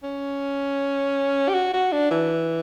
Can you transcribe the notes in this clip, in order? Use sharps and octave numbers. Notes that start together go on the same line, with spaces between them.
C#4
G4
F#4
F#4
D4
E3